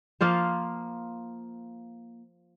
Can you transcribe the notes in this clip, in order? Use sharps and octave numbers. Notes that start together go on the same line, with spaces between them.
F3 A#3 F4 C5